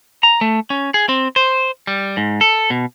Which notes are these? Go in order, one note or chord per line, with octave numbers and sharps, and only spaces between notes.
A#5
A3
C#4
G#4
C4
C5
G3
G#2
A4
B2